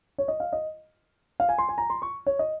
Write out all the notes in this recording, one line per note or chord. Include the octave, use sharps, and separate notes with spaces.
C#5
D#5
F5
D#5
F5
G#5
C6
G#5
A#5
C6
C#6
C#5
D#5